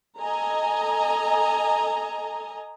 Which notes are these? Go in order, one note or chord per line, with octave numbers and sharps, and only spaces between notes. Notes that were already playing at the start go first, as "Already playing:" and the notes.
A4 D#5 G#5 A#5